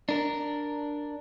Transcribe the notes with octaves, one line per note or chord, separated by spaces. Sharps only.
D4 A#4